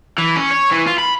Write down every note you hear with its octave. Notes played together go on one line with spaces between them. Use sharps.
E3
C#4
C#5
E3
F4
B5